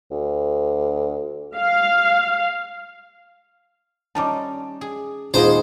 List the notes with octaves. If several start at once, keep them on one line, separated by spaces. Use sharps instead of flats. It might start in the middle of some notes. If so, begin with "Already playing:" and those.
D2
F5
G3 C#4 D#4 A5 D6
G#4
D#1 G#3 B3 D#4 F4 G4 G#4 C5